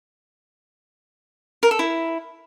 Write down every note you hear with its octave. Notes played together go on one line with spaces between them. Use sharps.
A#4
A4
E4